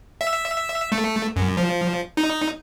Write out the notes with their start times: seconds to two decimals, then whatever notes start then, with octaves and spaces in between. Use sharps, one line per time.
0.21 E5
0.92 A3
1.36 F#2
1.57 F3
2.17 D#4